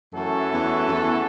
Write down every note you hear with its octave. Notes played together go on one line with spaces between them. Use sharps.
F#2 E3 A3 C#4 F#4 A4
E2
F#2
E2